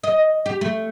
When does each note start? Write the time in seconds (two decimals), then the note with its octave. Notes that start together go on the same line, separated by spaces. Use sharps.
0.03 D#5
0.46 G4
0.61 A3